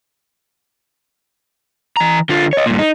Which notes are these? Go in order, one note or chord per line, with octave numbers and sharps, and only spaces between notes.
E3 A#5
D3 F4
C#5 D#5
G2 A#2
D#4